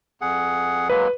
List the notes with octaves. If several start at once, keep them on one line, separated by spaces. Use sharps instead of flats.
F2 G#4 F#5
F#3 G#3 A#3 B4